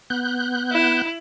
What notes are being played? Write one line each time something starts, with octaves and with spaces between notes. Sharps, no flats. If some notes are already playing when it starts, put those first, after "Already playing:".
B3 F#6 G6
E4